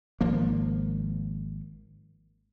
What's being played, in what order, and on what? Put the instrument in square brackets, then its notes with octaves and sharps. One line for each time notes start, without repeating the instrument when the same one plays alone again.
[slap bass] G#1 F3 A#3